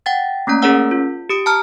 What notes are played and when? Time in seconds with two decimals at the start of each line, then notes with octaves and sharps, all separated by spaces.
0.06 F#5 G5 A6
0.47 A3 A#3 C#4 A#5
0.62 C#4 G#4 A#4 C#5 F#5 E6
0.91 F4
1.29 G4 D#6 D7
1.46 A5 A#5 F6